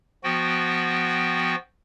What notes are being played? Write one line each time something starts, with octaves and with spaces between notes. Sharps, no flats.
F3 B3 F#4 G5